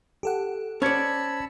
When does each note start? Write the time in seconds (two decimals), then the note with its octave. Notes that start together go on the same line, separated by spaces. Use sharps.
0.23 G4 A4 F#5
0.82 C#4 C5 D5 A5 B5 E6 G#6 C#7